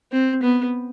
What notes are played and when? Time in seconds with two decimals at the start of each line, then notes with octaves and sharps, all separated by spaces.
0.12 C4
0.43 B3